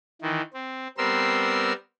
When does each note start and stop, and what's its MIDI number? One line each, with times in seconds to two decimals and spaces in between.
0.22 0.41 51
0.22 0.41 52
0.54 0.88 60
0.98 1.73 55
0.98 1.73 59
0.98 1.73 60
0.98 1.73 70
0.98 1.73 84
0.98 1.73 88